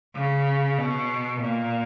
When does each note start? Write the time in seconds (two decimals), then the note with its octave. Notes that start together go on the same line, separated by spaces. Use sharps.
0.16 C#3
0.78 B2
1.41 A#2